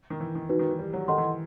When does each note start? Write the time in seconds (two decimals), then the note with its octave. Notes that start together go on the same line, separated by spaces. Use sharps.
0.10 D#3
0.20 E3
0.35 D#3
0.49 E3 D#4 F#4 B4
0.59 D#3
0.70 E3
0.79 G3
0.93 F#3
1.08 D#3 A4 D#5 F#5 C6
1.18 E3